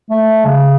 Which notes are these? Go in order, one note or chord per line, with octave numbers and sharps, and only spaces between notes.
A3
C#3